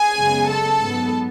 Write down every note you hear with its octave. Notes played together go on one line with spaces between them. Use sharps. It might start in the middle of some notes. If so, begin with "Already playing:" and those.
Already playing: G#4 G#5
F#2 C#3 G#3 B3
A4 A5
G#2 F#3 B3